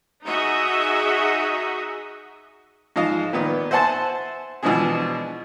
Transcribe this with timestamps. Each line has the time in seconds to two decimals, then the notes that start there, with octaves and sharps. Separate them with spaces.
0.24 D#4 F#4 G#4 D#5 E5
2.96 G#2 F3 D#5 F5
3.33 A#2 D#3 B3
3.71 C5 E5 F#5 G#5 A5 C6
4.63 B2 E3 F3 G#3 D4 G#4